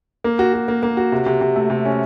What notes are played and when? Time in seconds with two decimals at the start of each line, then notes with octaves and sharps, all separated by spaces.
0.24 A#3
0.39 F#4
0.53 F#4
0.68 A#3
0.83 A#3
0.97 F#4
1.12 C3
1.26 C3
1.41 C3
1.56 A3
1.70 C3
1.85 C#4